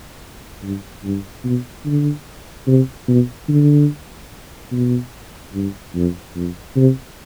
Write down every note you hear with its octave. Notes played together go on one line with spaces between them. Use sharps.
G2
G2
B2
D3
C3
B2
D3
B2
G2
F2
F2
C3